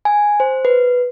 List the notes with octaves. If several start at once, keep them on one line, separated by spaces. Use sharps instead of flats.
G#5
C5
B4